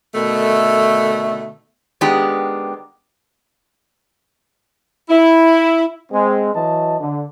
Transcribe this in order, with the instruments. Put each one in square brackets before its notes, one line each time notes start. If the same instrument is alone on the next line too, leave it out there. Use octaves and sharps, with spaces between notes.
[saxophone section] B2 D3 D#3 A3
[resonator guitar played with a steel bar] D#3 G#3 B3 D4 G4
[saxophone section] E4
[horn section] G#3 C4
E3 F#3 D#5 A5
D3